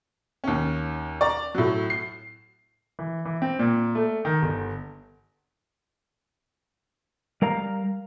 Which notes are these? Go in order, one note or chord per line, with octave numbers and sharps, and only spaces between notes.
D#2 C#4
D5 A#5
A2 F#3
C7
E3
E3
C4
A#2
A3
D#3
G1
G3 A#4 F5 A#5